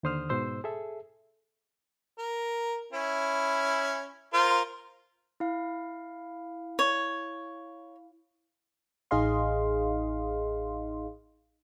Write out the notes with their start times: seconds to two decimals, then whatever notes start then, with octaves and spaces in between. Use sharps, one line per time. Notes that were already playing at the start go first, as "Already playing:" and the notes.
0.03 D#2 D3 C5 D#6 F6
0.29 G#2 B2 C5 E6
0.64 G#4 A4 E5
2.18 A#4
2.93 C#4 E4
4.33 F4 A#4 C5
5.40 E4 F5
6.79 C#5
9.11 A1 D#4 G#4 D#5 F5 C6